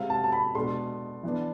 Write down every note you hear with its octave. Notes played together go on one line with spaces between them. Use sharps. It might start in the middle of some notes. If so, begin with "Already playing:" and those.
Already playing: C3 G#3 C4 F5
A5
A5
B5
B2 G#3 D4 C6
E3 B3 D4